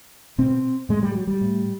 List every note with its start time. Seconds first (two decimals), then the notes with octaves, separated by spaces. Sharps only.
0.38 B2 C4
0.89 A2 G#3
1.03 G3
1.15 F#3
1.27 G3
1.41 A2